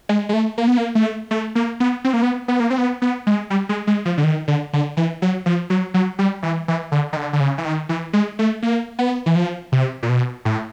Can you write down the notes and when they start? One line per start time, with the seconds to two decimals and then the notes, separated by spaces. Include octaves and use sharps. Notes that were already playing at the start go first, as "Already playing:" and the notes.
0.09 G#3
0.29 G#3
0.33 A3
0.58 A#3
0.68 B3
0.77 A#3
0.95 A3
1.31 A3
1.55 A#3
1.80 B3
2.04 C4
2.13 A#3
2.22 B3
2.48 B3
2.60 A#3
2.70 C4
2.78 B3
3.02 B3
3.27 G#3
3.50 G3
3.69 G#3
3.87 G#3
4.05 F3
4.18 D3
4.24 D#3
4.48 D3
4.73 D3
4.97 E3
5.22 F#3
5.46 F3
5.70 F#3
5.94 F#3
6.19 G3
6.43 E3
6.68 E3
6.92 D3
7.13 D#3
7.17 D3
7.33 D3
7.40 C#3
7.58 E3
7.65 D#3
7.89 E3
8.13 G#3
8.39 A3
8.62 A#3
8.99 B3
9.26 E3
9.36 F3
9.72 C3
10.03 A#2
10.09 B2
10.45 A2